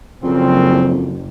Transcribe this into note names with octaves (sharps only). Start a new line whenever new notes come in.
F#1 F2 A#2 C#3 C4